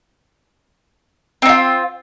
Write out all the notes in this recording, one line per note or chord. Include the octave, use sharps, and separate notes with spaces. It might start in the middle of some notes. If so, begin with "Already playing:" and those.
C4 D#4 F4